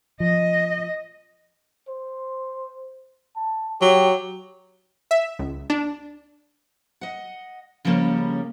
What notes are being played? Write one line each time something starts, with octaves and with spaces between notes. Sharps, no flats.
F3 D#5
C5
A5
F#3 G4
E5
C#2
D4
D#5 F#5
C#3 F3 G3 A#3 C#4